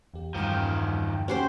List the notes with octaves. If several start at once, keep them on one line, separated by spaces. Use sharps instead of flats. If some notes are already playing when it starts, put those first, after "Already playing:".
E2 G4
E2 G2 D#3 F3 A#5
C#4 F#4 G4 C5 F#5 C6